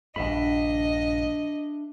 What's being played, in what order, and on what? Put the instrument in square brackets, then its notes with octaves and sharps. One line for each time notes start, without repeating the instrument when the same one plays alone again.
[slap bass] A#1 G2 [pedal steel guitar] D4 E5 B5 [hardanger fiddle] D#5